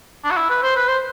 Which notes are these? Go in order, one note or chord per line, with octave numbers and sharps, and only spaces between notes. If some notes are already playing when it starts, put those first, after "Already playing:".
D4
F#4
E4
B4
C5
B4
C5